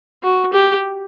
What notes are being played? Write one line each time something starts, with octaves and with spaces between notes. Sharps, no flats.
F#4
G4